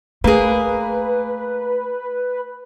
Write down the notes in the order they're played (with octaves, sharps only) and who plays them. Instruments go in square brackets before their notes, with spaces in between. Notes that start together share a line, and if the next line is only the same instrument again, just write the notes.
[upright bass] A3 [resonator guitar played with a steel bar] A#3 G#4 [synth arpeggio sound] B4